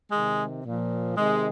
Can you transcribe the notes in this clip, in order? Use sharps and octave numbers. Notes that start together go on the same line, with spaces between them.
C3 D#3 G#3
A#2 F3
C3 D#3 G#3